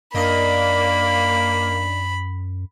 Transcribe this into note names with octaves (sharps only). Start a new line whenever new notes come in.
F#2 A#3 D4 D#5 B5